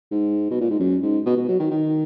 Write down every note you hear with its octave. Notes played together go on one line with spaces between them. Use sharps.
G#2
B2
A#2
G#2
F#2
G#2
B2
B2
F#3
D#3
D#3